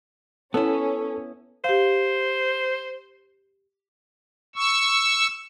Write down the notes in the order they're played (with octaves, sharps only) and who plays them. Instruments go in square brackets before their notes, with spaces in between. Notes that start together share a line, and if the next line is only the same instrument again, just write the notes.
[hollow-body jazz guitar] B3 E4 [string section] C#4 [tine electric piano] A4
[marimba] G4 F5 [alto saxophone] C5
[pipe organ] C#6 E6